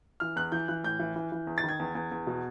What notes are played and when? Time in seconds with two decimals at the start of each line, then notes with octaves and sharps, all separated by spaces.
0.20 E3 F6
0.36 E2 F#6
0.52 E3 G6
0.68 E3 F#6
0.84 A2 G6
1.00 E3
1.16 E3
1.32 E3
1.47 E2
1.58 A6
1.63 D#3
1.69 G#6
1.79 E2
1.95 E2
2.11 E2
2.27 B2